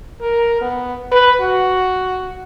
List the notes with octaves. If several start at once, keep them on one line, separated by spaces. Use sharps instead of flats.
A#4
B3
B4
F#4